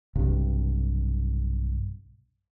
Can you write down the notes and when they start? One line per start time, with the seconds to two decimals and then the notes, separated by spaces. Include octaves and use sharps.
0.15 B1 G2 C3